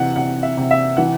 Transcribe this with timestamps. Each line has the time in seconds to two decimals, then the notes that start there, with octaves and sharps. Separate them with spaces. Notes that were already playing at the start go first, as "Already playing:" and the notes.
Already playing: C3 E3 F#5
0.16 C3 F#5
0.43 E5
0.57 C3
0.71 E5
0.97 E3 F#5